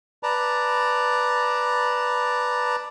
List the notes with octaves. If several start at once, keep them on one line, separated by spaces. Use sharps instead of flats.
B4 D5 A5 A#5